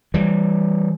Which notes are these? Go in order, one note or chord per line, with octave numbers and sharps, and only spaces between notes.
E3 G3